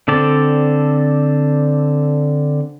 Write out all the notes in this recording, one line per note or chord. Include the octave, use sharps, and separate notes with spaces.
D3 C4 A4 D5